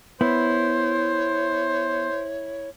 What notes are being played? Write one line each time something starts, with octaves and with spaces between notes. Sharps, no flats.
B3 E4 C5 C#5